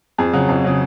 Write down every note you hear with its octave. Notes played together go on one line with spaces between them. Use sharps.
F2 G#4
C#3 F#3
F2
C#3 F#3